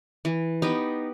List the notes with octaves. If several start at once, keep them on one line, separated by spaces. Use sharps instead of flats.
E3
B3 D#4 G4